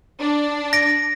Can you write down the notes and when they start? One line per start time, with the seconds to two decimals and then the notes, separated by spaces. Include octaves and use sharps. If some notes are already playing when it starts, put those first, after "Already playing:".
0.21 D4
0.73 A#6 D7